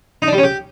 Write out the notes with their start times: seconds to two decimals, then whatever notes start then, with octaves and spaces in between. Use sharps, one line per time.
0.22 D#4
0.27 D4
0.33 G3
0.38 C#4
0.43 G4